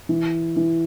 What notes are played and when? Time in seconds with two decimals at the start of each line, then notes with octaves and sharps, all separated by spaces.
0.09 E3
0.57 E3